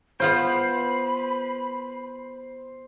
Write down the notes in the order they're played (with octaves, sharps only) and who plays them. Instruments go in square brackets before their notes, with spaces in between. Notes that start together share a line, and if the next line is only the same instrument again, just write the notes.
[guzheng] B3 F4 G5 [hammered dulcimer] C5 [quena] B5